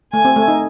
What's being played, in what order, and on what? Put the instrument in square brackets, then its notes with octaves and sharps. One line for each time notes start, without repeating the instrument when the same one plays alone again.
[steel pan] A3 [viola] G#5
[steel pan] C4
A3
D#4